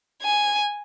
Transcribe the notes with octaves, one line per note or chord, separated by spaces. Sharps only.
G#5